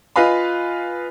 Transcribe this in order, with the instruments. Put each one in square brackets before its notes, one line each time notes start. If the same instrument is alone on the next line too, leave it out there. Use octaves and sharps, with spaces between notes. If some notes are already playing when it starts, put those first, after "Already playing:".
[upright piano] F4 B4 D#5 F5 G#5 B5